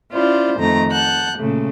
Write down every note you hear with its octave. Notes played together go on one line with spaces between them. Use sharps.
C#4 E4 F4 C5 D5
F2 D#3 A3 A#5
F#5 A5 F#6 G6
A#2 C#3 A3